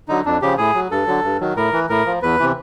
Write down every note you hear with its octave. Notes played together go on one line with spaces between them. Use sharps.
D3 F#3 D#4
F2 D4
C#3 F3 G4
A2 G#4
F#3
G2 A4
D3 F#3
G2
D#3 F#3
A2 A#4
E3
A2 A#4
F3
E2 B4
C3 E3